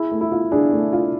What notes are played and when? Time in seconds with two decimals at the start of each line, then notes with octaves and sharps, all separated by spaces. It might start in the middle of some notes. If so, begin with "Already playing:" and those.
Already playing: E4 G#4
0.12 A3
0.21 E4
0.32 F4
0.52 D4 G#4
0.72 A3
0.93 F4